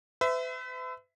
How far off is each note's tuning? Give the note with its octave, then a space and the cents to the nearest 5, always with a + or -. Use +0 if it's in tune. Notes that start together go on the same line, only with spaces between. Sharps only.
B4 +45 E5 +0